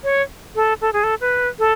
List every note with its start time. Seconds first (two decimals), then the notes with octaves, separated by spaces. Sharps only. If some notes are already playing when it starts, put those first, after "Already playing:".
0.04 C#5
0.55 A4
0.81 A4
0.93 G#4
1.04 A4
1.21 B4
1.59 A4